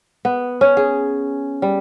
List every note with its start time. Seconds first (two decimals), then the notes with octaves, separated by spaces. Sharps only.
0.25 B3
0.61 C#4
0.77 G#4
1.62 G3